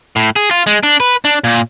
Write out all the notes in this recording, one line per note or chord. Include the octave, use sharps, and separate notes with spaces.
A2
G#4
F4
G#3
D4
B4
D4
A#2